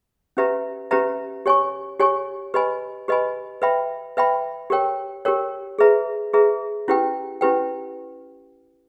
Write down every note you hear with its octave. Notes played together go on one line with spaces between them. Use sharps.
C#4 G4 B4 E5 A#5
C#4 G4 B4 E5 A#5
G4 C#5 G#5 C#6
G4 C#5 G#5 C#6
G4 B4 D#5 G#5 B5
G4 B4 D#5 G#5 B5
B4 E5 G5 B5
B4 E5 G5 B5
G4 A#4 C#5 G5
G4 A#4 C#5 G5
G#4 B4 E5 A#5
G#4 B4 E5 A#5
C#4 E4 G4 B4 G5
C#4 E4 G4 B4 G5